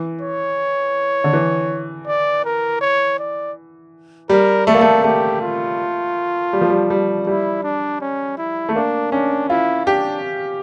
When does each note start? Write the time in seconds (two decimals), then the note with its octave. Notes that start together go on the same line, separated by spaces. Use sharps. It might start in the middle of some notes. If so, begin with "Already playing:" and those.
Already playing: E3
0.21 C#5
1.24 D3
1.33 E3
2.07 D5
2.45 A#4
2.81 C#5
3.19 D5
4.29 G3 A#4
4.66 A3 A4
4.75 A#3
4.81 A3
5.04 A3 G4
5.41 F4
6.53 G3
6.61 F3
6.69 G3
6.90 G3
7.27 G3 E4
7.63 D4
8.01 C#4
8.37 E4
8.69 A3
8.75 A#3 D4
9.12 C#4 D4
9.49 E4 F4
9.86 D4 G4